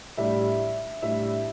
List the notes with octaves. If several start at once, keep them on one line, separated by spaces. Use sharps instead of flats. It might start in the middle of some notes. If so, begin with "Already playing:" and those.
A2 G3 D4 E5
A2 G3 D4 E5